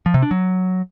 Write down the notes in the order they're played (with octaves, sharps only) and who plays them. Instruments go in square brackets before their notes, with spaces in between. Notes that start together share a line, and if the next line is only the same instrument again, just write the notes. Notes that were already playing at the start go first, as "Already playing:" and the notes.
[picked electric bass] F3
C3
D4
F#3